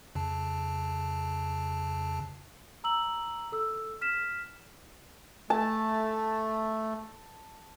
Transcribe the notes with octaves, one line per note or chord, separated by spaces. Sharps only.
F2 C#3 A5
A#5 E6 F#7
A4 E6
F6 B6 E7
A3 A5